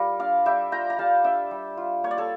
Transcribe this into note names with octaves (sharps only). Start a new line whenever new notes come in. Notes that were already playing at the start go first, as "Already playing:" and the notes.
Already playing: G3 F4 A#4
D4 D5 F5
G3 E5 G5
F4 G5 A#5
A#5
G3 F5 A5
D4 E5 G5
G3
F4
A#3 C#5
D5
A4 C#5